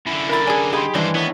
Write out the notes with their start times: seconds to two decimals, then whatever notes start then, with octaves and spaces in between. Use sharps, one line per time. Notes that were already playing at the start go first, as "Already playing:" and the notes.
0.06 F#2 D3 E4
0.29 A#4 B5 A6
0.47 D4 G#4 G#5
0.73 D#4 G4 G#4 G#5 B5 C6
0.95 G2 D#3 E3 G#3 A3 D4 C5
1.15 B3 E4 C#5